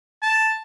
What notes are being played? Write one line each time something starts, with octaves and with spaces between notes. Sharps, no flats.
A5